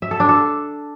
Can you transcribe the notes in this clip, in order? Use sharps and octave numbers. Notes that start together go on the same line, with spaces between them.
E5
A4
D4
A4